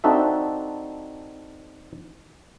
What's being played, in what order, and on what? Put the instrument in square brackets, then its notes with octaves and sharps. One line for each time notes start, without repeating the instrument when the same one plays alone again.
[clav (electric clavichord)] C4 D4 D#4 F#4 A4 E5